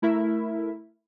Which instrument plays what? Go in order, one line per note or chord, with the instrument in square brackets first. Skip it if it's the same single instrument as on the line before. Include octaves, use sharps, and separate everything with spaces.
[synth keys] A3 E4 A#4 E5